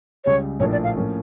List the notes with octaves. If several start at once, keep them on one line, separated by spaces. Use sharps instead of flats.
C#2 C#3 G3 C#5
A#1 A2 F3 A#3 D4 C#5
D5
F5
A2 F3 A#3 C#4